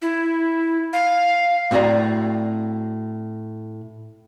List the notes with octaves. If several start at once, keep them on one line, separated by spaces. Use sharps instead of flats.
E4
F5
A2 C4 F#4 D5 A#5